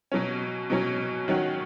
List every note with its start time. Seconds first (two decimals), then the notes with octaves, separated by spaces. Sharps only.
0.12 B2 F#3 C#4
0.70 B2 F#3 C#4
1.28 D#3 F#3 C#4 F#4